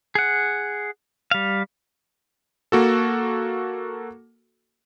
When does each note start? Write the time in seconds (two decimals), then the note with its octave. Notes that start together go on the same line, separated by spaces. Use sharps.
0.15 G#4 F#5
1.31 G3 F5
2.72 A#3 F#4 A4